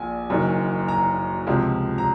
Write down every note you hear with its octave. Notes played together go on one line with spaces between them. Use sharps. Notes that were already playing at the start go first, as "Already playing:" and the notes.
Already playing: A#1 A#2 F3 G#5
F#1 F#2 D#3
A#5
C#2 C3 F3
A#5